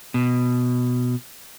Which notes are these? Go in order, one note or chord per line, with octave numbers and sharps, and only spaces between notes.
B2